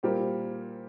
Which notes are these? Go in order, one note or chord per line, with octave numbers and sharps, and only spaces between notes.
A#2 G3 C4 G4 A#4